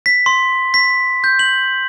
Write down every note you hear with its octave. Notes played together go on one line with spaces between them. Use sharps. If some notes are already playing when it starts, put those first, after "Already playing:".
B6
C6
B6
G6
F#7